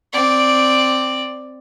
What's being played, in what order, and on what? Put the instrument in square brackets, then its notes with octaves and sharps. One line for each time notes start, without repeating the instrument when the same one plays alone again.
[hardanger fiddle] C4 D5